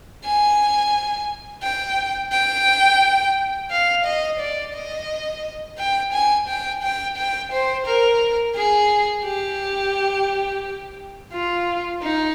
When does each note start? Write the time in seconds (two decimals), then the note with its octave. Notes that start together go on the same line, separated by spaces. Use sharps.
0.24 G#5
1.63 G5
2.32 G5
3.70 F5
4.05 D#5
4.39 D5
4.74 D#5
5.78 G5
6.13 G#5
6.48 G5
6.83 G5
7.17 G5
7.52 C5
7.86 A#4
8.56 G#4
9.24 G4
11.33 F4
12.02 D#4